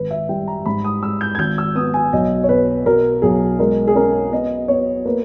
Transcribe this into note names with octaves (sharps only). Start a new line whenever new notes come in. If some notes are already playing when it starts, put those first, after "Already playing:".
Already playing: G#1 B4
E5
G3 G5
A#5
G#2 B5
D#6
G#3 E6
G6
G#6
G#1 G6
E6
B3 D#6
G#5
B1 D#5
C#5
B2 B4
B2 A#4
B1 G#4
G#3 A#4
G#4
C#4 A#4
B3 D#5
B3 C#5
A#3 B4